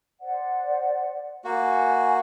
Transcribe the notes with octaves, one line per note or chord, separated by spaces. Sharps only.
C5 D5 F#5
A#3 F#4 G#5